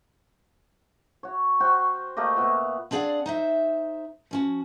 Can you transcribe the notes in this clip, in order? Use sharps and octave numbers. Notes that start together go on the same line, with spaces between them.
F#4 C#5
F#4 C5 G5 C#6
A3 A#3 G4 D#5
A#2 B3 E5 F#5
C4 D4 G#4 D5 F5 F#5
D#4 C5 E5
F3 C#4 F#4